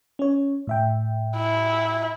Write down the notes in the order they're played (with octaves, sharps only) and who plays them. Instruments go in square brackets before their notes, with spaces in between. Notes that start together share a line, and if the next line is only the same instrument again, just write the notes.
[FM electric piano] C#4 C#5
A2 E5 G5
[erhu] E4